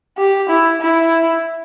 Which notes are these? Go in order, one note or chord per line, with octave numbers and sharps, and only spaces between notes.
G4
E4
E4